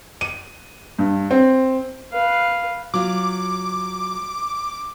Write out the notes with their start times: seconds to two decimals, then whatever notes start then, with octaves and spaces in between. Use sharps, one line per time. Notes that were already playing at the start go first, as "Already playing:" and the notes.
0.21 D#7
0.99 G2
1.31 C4
2.12 B4 F5
2.94 F#3 F4 D6